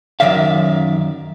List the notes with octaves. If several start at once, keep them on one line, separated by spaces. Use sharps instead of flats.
F#2 C3 D#3 D5 E5 F5